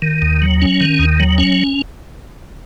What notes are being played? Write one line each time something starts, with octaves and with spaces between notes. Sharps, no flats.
D#3
D#2
F#3
C#4
D#3
D#2
F#3
C#4